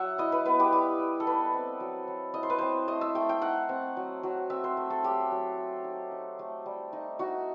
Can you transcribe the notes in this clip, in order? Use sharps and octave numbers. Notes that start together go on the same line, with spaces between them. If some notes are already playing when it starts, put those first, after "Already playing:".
Already playing: F#3 E5 F#5
E4 D#5
B4
B3 B4
G4
G3 G4
G3
A4
D#4 B4
C4
F#3
F#3
E4 D#5
C5
B4
C4 C5
A3 D#5
E5
A3 G5
G5
D#4 F#5
C4
F#3
F#3
C4 E5
C5
A3
A4
F#3 G4
F#3
A3
D#4
D#4
A3
G3
D#4
D#4 F#4